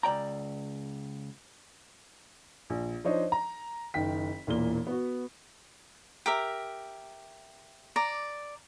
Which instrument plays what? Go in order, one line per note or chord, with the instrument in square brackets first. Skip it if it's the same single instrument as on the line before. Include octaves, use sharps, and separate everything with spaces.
[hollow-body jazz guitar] C#2 D5 G5 A#5
[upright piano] A#1
F3 D4 D#4 C5 C#5 D#5
A#5
F#1 D#3 G5 B6
E1 A#2 E3 A#3 G7
B3 F#4
[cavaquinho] G4 A#4 E5
D5 A#5